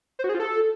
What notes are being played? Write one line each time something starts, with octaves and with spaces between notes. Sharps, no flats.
C5
F#4
G#4
F4
A4